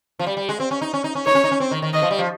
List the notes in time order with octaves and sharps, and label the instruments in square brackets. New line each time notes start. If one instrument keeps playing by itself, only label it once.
[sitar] F3
G3
G3
G#3
C4
C#4
D#4
C#4
D#4
C#4
[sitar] D#4 [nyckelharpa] C#5
[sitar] C#4
D#4
C#4
C4
D#3
D#3
[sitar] D#3 [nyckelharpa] D#5
[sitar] F3
G3
F3